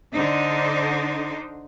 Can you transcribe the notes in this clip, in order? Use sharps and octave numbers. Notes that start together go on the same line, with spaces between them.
D3 D4 D#4 C5